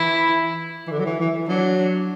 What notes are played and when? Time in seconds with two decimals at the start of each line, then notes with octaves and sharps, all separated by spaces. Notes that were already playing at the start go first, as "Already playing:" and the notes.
Already playing: E3 E4
0.87 E3
0.92 D3
1.00 F#3
1.06 E3
1.20 E3
1.48 F#3 D4